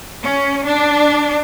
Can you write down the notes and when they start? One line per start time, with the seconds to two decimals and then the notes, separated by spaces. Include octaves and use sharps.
0.24 C#4
0.65 D4